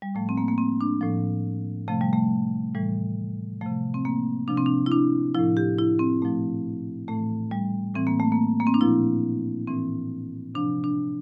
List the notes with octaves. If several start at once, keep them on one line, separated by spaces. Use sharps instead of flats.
G3
A2 F3 A3
C4
A#3
A#3
C4
D4
A2 F3
C3 F3 A3
G3
A3
A2 E3 G3
C3 F3 A3
C4
A#3
C3 F3 D4
C4
D4
E4
D4
A2 F3 E4
G4
E4
C4
A#2 F3 A3
A2 E3 A3
G3
A2 E3 C4
A#3
A3
A#3
A#3
C4
D4
A#2 F3 E4
A2 E3 C4
C3 F3 D4
D4